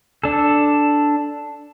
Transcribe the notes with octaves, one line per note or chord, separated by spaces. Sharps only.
D4 A4